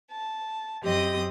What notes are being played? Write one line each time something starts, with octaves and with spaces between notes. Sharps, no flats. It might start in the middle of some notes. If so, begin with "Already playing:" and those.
A5
F#2 C4 G4 D#5 D#6